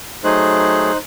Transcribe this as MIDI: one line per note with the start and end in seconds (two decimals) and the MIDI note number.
0.24 0.92 54
0.24 0.92 57
0.24 0.97 63
0.24 0.92 68
0.24 0.97 72
0.24 0.97 90